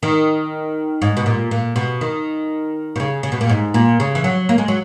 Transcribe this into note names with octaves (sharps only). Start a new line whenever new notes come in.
D#3
G#2
B2
A#2
A#2
B2
D#3
B2
C#3
C#3
B2
A#2
G#2
A#2
C#3
E3
F#3
A#3
G#3
F#3